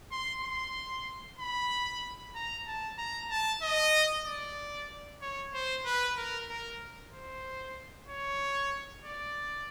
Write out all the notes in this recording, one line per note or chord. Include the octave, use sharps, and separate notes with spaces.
C6
C6
B5
A#5
A5
A#5
A5
D#5
D5
C#5
C5
B4
A#4
A#4
C5
C#5
D5